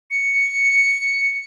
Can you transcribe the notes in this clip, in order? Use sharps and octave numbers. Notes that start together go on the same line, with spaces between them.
C#7